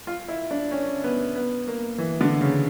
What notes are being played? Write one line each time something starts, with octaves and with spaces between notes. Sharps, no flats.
F4
E4
D4
C#4
B3
B3
A#3
E3
D3
C#3